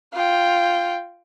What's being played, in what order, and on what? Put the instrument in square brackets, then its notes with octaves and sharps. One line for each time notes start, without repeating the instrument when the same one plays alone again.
[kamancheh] F4 G5